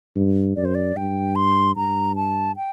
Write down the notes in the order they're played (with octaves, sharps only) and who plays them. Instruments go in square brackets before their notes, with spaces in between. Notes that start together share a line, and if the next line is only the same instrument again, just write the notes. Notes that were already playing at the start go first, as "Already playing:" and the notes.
[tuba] G2
[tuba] F#2 [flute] D5
[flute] C5
D5
[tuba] G2 [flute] G5
[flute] C6
[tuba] G2 [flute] A#5
[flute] A5
G5